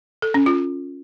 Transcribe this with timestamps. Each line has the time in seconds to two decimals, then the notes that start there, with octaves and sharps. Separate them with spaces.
0.22 A4
0.34 C#4
0.46 F4